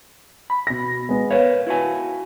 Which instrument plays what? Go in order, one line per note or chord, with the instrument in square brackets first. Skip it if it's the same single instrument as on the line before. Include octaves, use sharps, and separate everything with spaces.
[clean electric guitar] B5
[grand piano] B2 A#6
G#3 B3
[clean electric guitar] A#4 B4 C#5 [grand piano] F5
[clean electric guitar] E4 F#4 G#5